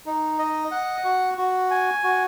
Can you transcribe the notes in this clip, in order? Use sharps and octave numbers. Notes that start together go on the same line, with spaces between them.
D#4
D#5
F#5
F#4
F#4
G#5
F#4